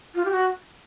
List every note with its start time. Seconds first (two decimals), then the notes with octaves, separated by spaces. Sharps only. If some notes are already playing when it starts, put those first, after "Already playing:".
0.15 F4
0.25 G4
0.31 F#4